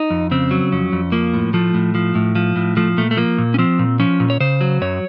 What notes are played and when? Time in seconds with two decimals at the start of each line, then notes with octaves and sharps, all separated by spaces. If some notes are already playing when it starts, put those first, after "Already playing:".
Already playing: D#4
0.10 F2
0.31 C#3 C4
0.51 F#3
0.72 F2 C#4
0.92 F2
1.12 F3 A#3
1.34 A2
1.54 F3 A3
1.74 A2
1.95 F3
2.15 A2
2.35 F3
2.56 A2
2.77 F3 A3
2.97 A#2 A3
3.11 A3
3.17 F3 A#3
3.38 A#2
3.54 C#4
3.58 F3 C4
3.79 A#2
4.00 F3 C#4
4.20 A#2
4.30 C#5
4.40 C#3 C5
4.61 F#3
4.81 F#2 C#5